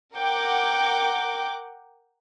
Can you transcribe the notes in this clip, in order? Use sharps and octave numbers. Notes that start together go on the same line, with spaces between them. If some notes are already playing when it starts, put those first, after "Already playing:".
A#4 F#5 G5 D6